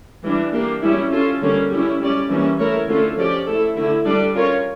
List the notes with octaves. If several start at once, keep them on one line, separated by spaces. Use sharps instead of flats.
E3 G3 D4
A#3 D4 G4
G3 C#4 E4
C#4 F4 A4
D3 G3 A#3 C#4
G3 C#4 E4
G3 C#4 G4 D5
E3 G3 A#3 C#4
A3 E4 A#4 C#5
D3 A3 C#4 F4 A4
F3 C#4 G4 D5
A3 E4 A4
D3 A3 E4
G3 D4 A4 D5
C#4 F4 A#4 C#5